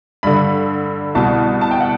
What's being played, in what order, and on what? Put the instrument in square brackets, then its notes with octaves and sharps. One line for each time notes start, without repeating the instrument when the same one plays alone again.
[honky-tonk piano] G2 D3 B5
C2 B2 A5
A5
G5
F#5